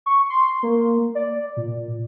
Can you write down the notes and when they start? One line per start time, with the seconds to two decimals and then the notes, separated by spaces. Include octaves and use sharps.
0.06 C#6
0.30 C6
0.63 A#3
1.15 D5
1.57 A#2